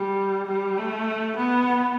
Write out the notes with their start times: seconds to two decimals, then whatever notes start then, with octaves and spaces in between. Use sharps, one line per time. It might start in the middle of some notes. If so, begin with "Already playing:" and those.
Already playing: G3
0.47 G3
0.77 A3
1.38 B3